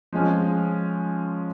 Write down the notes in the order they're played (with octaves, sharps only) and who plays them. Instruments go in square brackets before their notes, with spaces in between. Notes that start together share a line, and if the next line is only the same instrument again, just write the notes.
[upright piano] F3 G#3 C#4